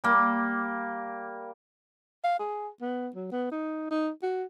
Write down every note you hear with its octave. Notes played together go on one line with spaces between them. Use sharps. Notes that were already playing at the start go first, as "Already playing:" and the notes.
G3 A#3
F5
G#4
B3
F#3
B3
D#4
D#4
F#4